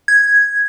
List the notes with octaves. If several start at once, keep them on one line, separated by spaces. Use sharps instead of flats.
G#6